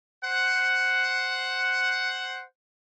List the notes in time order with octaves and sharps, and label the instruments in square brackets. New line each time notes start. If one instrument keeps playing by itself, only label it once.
[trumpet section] C5 F#5